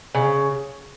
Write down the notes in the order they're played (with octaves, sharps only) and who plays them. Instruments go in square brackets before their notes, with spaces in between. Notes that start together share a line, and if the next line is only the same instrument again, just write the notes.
[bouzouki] C#3